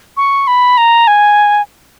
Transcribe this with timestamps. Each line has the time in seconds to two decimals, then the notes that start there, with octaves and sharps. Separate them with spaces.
0.17 C#6
0.47 B5
0.77 A#5
1.07 G#5